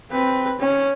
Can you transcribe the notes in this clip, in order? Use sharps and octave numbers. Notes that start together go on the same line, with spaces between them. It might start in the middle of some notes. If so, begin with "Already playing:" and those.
C4 B4
C#4